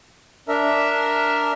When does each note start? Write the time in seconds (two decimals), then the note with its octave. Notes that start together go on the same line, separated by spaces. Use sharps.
0.48 D4 A#4 E5